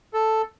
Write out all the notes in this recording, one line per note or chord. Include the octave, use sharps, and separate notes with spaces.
A4